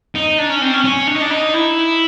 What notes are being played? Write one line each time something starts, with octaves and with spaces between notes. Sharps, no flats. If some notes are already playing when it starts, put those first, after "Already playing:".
D#4
D4
C#4
C4
C#4
C#4
D4
D#4
D4
D#4
E4